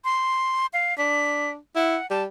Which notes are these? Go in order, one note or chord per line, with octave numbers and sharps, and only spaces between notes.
C6
F5
D4 B6
E4 F#5
G3 A5